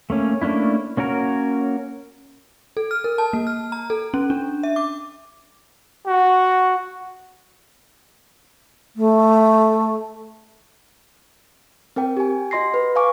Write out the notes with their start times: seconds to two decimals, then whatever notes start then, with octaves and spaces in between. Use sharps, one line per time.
0.10 A3 A#3 C#4
0.42 A3 A#3 C#4 D4 E4
0.97 A#3 C#4 F#4 A#4
2.77 A4
2.91 F6
3.04 A#4
3.18 A5
3.33 A#3
3.47 F6
3.72 A#5
3.90 A4
4.14 C#4
4.30 D4
4.63 E5
4.76 D6
6.06 F#4
8.96 A3
11.96 C4 A#4 G5
12.17 G4 G#5
12.51 F#4 D#5 C6 A#6 C7
12.74 B4
12.95 B4 F5 G#5 C#6 D6